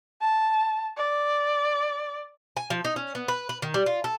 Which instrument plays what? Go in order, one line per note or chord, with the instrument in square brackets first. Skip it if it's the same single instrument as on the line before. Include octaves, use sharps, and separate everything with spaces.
[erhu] A5
D5
[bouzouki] G#5
F3
D#4
C#4
B3
B4
B4
D#3
G3
F4
A4